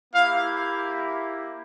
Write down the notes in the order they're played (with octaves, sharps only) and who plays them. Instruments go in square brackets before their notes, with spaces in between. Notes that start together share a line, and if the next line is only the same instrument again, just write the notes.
[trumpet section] A#3 E4 G4 F5